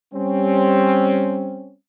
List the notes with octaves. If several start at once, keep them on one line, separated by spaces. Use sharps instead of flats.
G3 C4 C#4